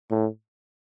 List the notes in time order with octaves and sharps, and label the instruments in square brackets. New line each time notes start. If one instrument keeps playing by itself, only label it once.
[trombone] A2